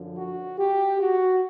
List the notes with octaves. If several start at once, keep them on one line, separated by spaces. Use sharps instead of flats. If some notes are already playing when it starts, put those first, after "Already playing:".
Already playing: F#2 D3 F3
F#4
G4
F#4